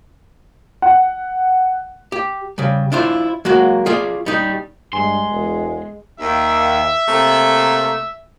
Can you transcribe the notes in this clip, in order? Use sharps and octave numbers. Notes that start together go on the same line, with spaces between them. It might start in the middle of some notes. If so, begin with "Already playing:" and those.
F#5
G4
C#3 G3
D4 E4 F4 C5
F#3 G#3 A#3 F#4
F4 G#4 D5
G3 D#4
G2 G#3 G#5 C6
E1
D#2 E5
C3 A3 A#3